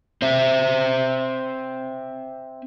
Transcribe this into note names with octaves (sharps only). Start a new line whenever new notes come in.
C4 C5 E5